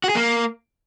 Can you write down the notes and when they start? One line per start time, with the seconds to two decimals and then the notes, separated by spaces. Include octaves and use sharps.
0.04 F#4
0.09 G#4
0.15 A#3